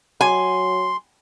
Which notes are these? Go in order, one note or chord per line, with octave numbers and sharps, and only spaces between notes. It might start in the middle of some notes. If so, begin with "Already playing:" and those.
F#3 G#5 C6